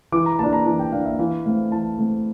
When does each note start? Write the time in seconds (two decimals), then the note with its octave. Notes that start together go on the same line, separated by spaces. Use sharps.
0.12 E3 D6
0.26 A#5
0.39 A#3 D4 A5
0.53 A#5
0.66 E3 A5
0.79 G5
0.92 A#3 D4 F5
1.06 E5
1.19 E3 F5
1.46 A3 C4 F5
1.71 E3 A5
1.98 A3 C4